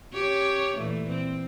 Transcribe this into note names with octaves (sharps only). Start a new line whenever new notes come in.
C#4 G4 C#5
A#2 E3 A3
C4